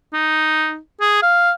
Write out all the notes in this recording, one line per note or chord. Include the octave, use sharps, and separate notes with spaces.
D#4
G#4
F5